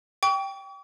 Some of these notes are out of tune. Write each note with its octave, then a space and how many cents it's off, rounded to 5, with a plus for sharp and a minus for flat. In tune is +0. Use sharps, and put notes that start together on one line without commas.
G5 +0 C#6 +45